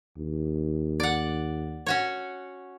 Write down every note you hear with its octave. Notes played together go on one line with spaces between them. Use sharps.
D#2
D5 F#5
C#4 F#4 C#5